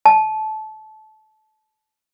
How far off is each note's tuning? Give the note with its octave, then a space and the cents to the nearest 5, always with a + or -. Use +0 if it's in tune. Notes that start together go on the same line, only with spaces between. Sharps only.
A5 -25